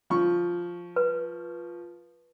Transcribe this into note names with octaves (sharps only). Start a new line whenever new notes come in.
F3 C#6
B4